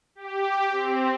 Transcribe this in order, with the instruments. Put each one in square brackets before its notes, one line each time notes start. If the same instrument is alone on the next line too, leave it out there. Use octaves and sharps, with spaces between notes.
[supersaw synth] G4
C4